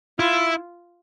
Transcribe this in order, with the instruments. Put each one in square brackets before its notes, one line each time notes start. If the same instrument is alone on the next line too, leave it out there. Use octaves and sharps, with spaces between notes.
[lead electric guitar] E4 [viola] F4